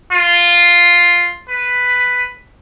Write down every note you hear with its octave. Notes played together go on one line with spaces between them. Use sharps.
F4
B4